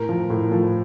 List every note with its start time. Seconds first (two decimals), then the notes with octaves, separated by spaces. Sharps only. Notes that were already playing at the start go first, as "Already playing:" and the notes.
Already playing: A2 A#4
0.09 F3
0.30 A2
0.52 F3